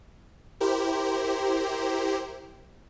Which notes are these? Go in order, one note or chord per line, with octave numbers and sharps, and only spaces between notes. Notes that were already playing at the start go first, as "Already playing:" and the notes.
E4 G4 A#4 C5